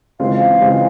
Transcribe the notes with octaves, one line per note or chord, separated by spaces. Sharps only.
C#3 E3 G#3 C4 F4 F5
C#3 E3 G#3 C4 F4